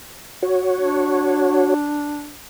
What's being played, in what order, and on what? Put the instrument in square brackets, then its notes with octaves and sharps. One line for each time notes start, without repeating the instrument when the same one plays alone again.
[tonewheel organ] F#4 C#5
[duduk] D4